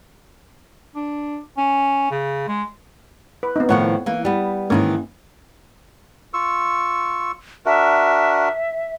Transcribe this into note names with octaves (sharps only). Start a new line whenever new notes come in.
D4
C#4
C#3
G#3
B4
B3 C4 D#4
A2 D#3 F3 C#5 F#5
E3 A#3
G3 B3
G#2 D#3 E3 A#3 C#4 E4
F4 C#6 E6
D4 F#4 A#4 E5